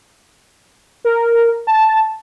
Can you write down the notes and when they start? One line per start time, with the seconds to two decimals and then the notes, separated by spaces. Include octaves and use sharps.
1.05 A#4
1.67 A5